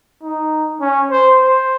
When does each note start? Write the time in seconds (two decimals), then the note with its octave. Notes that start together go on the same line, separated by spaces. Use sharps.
0.23 D#4
0.81 C#4
1.11 C5
1.40 C5